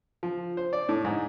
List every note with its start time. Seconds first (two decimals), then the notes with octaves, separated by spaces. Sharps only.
0.23 F3
0.57 C5
0.73 D5
0.89 A2
1.05 G#2